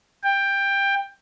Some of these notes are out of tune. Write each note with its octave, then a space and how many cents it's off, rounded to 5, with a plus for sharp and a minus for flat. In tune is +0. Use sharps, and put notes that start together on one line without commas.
G5 +15